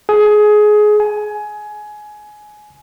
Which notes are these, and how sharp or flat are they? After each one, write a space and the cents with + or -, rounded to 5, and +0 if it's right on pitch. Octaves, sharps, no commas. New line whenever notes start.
G#4 +20
G#5 +20